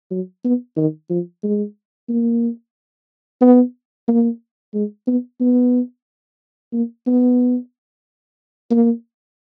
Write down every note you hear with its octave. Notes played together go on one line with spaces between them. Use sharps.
F#3
B3
D#3
F3
G#3
A#3
B3
A#3
G#3
B3
B3
A#3
B3
A#3